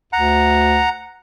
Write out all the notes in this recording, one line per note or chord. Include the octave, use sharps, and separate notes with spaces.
D2 F#5 A#5